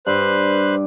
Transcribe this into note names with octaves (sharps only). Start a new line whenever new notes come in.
G2 B4 C5 F#6